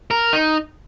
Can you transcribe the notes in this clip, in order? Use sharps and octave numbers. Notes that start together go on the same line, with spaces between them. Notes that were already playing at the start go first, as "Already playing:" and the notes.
A#4
D#4